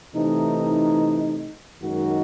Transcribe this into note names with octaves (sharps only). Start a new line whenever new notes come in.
C3 E3 A3 D#4
F#2 D#3 G#3 D#4 F#4